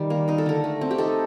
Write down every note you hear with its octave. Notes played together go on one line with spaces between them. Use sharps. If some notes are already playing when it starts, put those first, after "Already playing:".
Already playing: D#3 G3
A#3
D#4 A#4
A4
D3 A#4
A3
C4
G4
D#4 A4